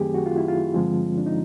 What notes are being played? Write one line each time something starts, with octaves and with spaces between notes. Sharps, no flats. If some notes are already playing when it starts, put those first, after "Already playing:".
Already playing: F#2 D#3 F#3 A3 C4 G4 G#4
F#4
F4
E4
F4
G2 D3 F3 G#3 C4
D4
D#4